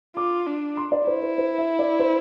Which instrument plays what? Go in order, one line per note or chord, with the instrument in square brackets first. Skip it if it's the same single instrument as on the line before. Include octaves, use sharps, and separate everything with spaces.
[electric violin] F4 [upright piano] D6
[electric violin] D4
[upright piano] C6
D5
[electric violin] E4 [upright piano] C5
[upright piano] C5
C5
E5
D5
C5